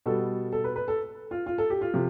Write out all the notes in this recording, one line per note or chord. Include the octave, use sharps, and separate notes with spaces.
B2 G3 A4
A4
B4
B4
A4
F4
F4
A4
G4
F4
C3 F3